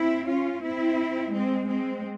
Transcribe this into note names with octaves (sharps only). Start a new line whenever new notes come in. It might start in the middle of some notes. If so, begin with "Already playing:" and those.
Already playing: C4 E4
C#4 F4
C4 E4
G#3 C4
G#3 C4